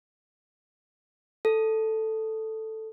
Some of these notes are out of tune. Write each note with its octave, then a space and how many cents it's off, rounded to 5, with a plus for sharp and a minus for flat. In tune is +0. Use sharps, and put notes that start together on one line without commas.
A4 +0